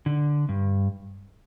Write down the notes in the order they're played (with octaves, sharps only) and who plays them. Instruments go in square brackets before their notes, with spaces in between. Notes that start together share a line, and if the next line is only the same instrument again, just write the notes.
[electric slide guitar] D3
G2